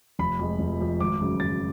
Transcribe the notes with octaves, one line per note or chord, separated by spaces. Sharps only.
F1 B5
F2 F3 G#3
F1
F2 F3 G#3
G#1 D6
F#2 C#3
G#1 A6